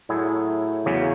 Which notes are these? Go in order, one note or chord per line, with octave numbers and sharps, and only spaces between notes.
A2 F#3 A3 E4 G#4
E2 C#3 F#3 C#4